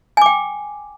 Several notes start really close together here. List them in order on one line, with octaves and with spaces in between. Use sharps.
G#5 D6 G5